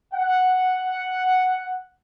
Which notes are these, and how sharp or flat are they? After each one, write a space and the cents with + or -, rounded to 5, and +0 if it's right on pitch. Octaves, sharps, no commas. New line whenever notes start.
F#5 +0